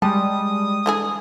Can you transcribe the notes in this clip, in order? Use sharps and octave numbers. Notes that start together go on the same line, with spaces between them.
G3 G#3 A5 D#6
D3 E3 G#4